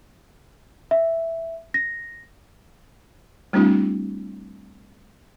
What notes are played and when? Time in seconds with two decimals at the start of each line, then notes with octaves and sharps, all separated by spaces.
0.91 E5
1.74 A#6
3.53 G3 A3 C4 D4 E4 F#4